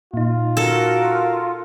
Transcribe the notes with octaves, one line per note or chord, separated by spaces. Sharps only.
A#2 D#4 F4
F#4 A4 A#4